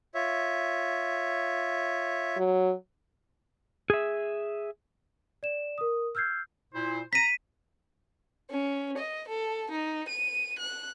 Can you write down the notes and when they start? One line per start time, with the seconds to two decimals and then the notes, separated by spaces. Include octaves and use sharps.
0.15 F4 C#5 E5
2.37 F#3
3.90 G#4 E5
5.43 D5 E7
5.78 A#4 D#6
6.15 E6 F6 G6 G#6 C7
6.73 A#2 E4 C5
7.13 A#5 B6 D#7
8.51 C#4
8.97 D#5
9.28 A4
9.71 D#4
10.08 D#7
10.58 F#6